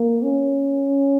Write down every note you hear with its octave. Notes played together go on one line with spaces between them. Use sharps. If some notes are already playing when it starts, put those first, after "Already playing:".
Already playing: A#3
C#4